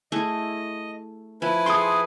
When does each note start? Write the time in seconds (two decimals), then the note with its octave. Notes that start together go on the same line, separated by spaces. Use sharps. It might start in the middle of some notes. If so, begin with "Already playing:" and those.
0.12 A3 E4 G#4 D#5
1.42 F3 E4 B4 G#5
1.66 G#4 A4 G5 C6 D#6